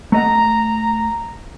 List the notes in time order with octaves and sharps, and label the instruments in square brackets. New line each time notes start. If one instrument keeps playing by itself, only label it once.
[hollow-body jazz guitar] A3 D#5 F#5 [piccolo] A#5